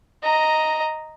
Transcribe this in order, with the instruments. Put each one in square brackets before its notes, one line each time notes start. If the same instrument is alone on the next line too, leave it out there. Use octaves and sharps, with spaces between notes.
[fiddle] D#5 A#5